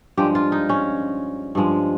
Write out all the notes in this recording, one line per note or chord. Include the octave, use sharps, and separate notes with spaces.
G2 F3 G#3 G4
F4
D#4
C#4
G2 F3 G#3